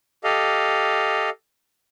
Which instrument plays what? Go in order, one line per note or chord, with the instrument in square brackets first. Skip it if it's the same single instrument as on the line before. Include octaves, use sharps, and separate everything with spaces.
[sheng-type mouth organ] G4 A4 D#5 F5